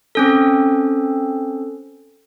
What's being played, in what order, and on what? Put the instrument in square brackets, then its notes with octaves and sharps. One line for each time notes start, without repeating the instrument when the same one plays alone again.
[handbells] C4 C#4 A4